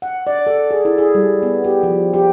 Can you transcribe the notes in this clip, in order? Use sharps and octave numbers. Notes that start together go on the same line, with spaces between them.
F#5
D5
A4
G#4
E4
G#4
G3
B3
G4
F3
G4